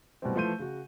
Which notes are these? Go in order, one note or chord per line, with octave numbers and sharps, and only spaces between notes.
B2 E3 F#3 G3 A3 C4
E3 F3 A3 C6 G6 D#7
C#3 F#4